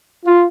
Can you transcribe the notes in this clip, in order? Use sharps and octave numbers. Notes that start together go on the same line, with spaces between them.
F4